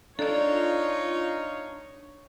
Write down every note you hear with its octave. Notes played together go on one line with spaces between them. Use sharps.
D4 D#4 F4 A4 C#5 D5